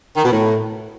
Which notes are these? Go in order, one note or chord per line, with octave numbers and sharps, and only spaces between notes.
D#3
B2
A2